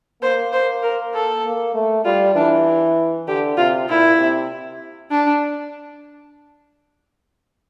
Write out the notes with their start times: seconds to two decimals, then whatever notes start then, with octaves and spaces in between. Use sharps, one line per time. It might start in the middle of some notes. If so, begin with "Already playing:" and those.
0.22 A#3 C5
0.52 C5
0.82 A#4
1.14 A4
1.45 A#3
1.74 A3
2.05 G3 F4
2.35 E3 D4
3.28 D3 G4
3.57 C3 F4
3.89 A#2 E4
4.18 C3
5.11 D4